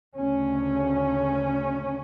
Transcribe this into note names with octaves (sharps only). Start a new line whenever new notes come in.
D2 C#3 C#4